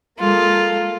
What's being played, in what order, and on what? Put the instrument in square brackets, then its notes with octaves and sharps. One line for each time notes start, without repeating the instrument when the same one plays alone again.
[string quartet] G#3 A#3 A4 [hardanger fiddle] F4